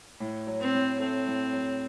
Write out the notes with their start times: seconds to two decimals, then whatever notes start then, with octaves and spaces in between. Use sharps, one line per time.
0.20 A2
0.47 F#3
0.60 C4
0.73 A2
1.00 A3 C4
1.27 A2
1.53 F#3